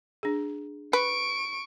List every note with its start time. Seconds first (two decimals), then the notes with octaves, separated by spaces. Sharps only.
0.23 D4 G#4
0.93 B4 C#6 D7